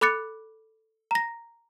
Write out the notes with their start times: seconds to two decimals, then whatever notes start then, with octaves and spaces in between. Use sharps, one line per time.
0.01 A4 B5 D6 F#6 A6 C#7
1.11 A#5 A#6